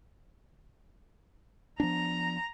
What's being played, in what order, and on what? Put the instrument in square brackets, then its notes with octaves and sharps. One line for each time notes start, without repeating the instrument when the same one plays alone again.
[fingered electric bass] F3 B3 D4 [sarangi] A#5